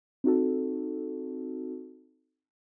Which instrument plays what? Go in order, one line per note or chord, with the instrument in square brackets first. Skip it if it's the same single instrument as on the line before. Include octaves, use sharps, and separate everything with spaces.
[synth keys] C4 D#4 F#4 A4